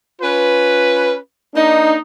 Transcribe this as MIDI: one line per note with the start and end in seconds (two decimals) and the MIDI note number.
0.21 1.15 61
0.21 1.15 65
0.21 1.15 71
1.54 1.97 58
1.54 1.97 62
1.54 1.97 63